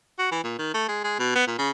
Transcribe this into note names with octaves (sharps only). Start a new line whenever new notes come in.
F#4
E3
A#2
D#3
A3
G#3
G#3
B2
B3
A#2
C#3